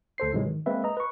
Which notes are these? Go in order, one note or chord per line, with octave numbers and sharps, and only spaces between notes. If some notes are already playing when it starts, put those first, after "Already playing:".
D2 A4 C5 C7
G#2 C3 E3 F#3 G#3
D#3
G#3 A#3 C4 B4 E5
D#5 A#5
B4 C#6